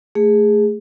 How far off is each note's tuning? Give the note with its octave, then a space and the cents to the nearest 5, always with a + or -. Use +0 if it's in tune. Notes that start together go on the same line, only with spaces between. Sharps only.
A3 +0 G#4 -10